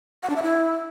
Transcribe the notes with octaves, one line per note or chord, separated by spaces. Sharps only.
F#5
D4
E5
E4